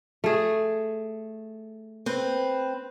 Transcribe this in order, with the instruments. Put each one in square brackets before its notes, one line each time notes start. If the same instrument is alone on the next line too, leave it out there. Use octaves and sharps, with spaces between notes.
[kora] A3 G#4
[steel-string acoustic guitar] C4 B4